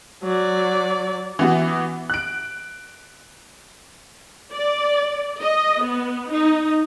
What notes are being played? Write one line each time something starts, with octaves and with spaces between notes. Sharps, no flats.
F#3 D5
E3 B3 F#4
F#6 D7
D5
D#5
B3
D#4